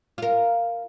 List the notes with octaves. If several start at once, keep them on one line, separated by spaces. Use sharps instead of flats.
F4 A#4